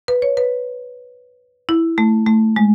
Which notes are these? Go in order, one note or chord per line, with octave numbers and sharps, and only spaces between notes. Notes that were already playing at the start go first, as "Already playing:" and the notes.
B4
C#5
B4
E4
A3
A3
G#3